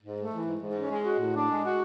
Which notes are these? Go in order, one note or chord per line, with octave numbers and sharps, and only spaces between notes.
G#2
A3
E3
G#2
G#2
C#4
G#3
F#4
A2
D4
G#3
F#4